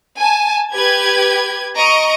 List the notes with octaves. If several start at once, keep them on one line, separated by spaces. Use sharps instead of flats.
G#5 A5
G4 B4 G#6
D#5 A#5 C#6 D7